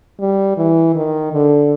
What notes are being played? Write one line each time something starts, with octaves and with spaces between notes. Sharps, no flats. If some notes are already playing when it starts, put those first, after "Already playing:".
G3
E3
D#3
D3